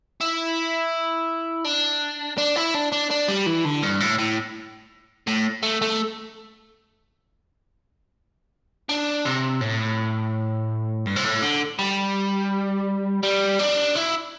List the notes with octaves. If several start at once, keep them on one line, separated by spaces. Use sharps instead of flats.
E4
D4
D4
E4
D4
D4
D4
G3
E3
D3
G2
A2
A2
A2
A3
A3
D4
C3
A2
G2
C3
A2
D3
G3
G3
D4
E4